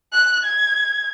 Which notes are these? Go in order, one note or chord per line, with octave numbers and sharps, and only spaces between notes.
F#6
G#6